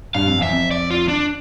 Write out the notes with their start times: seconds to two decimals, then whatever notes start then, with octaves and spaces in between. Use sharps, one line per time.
0.15 G2 F5
0.26 F2
0.38 E2 E5
0.49 F2
0.71 D5
0.91 F4
1.08 D4